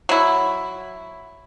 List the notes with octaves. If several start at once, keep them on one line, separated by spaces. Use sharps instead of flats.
F#3 E4